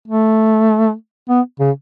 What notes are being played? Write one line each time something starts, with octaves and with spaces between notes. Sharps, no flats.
A3
B3
C#3